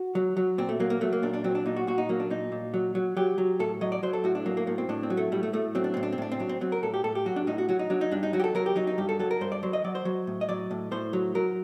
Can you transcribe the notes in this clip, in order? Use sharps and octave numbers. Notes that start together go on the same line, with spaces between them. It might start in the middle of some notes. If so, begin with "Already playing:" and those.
Already playing: F#4
F#3
F#3
A#2 C4
A3
F#3 A#3
A#3
F#3 A3
A#3
A#2 D4
D4
F#3 C4
D4
A#2 D#4
F#4
A#2 F#4
D#4
F#3 A#3
D4
A#2 D#4
A#2
F#3
F#3
F#3 G4
F#3
A2 A4
F#3 D#5
D5
F#3 C5
A4
A2 F#4
D4
F#3 A#3
A#3
A2 A#3
C4
A2 D4
C4
F#3
A3
A2 G3
A3
A2 A3
F#3 C4
D4
A2 C4
D4
C4
A2 D4
C4
F#3 D4
C4
F#3 C4
A#4
A2 A4
G4
A2 A4
G4
F#3 F#4
D4
A2 D#4
F#4
F#3 F#4
D#4
F#3 D4
D#4
G2 D4
D#4
F#3 F#4
G4
A4
F#3 A#4
G4
F#3 D#4
D#4
G2 G4
A4
F#3 A4
A#4
G2 C5
D5
F#3 C5
D#5
F#3 D5
C5
F#3
A2
D#5
F#3 D5
A2
A2 C5
F#3
F#3 A#4